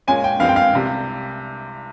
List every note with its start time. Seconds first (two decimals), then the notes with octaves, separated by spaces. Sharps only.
0.07 A#2 G#3 C#4 G#5
0.24 G5
0.40 G2 F3 G#3 C4 F5
0.49 G5
0.56 F5
0.73 C2 C3 G3